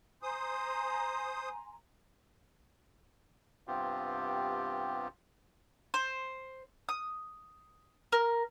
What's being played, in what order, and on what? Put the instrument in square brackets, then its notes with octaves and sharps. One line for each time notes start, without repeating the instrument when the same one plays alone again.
[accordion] C5 D#6 [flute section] G#5 A#5 C6
[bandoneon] G2 C3 B3 C4 F4 G4
[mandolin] C5
D#6
A#4